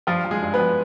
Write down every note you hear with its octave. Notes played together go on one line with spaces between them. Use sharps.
G2 F3 F4
F3
G#3 G#4
G2
B3 B4
F3